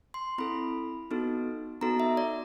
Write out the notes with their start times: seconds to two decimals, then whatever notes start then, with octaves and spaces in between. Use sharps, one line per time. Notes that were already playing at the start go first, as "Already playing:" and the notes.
0.14 C6
0.38 C4 E4 A4 B5
1.11 B3 D#4 F#4 A4
1.81 B3 D#4 F#4 A4 A#5
2.00 E5
2.17 D5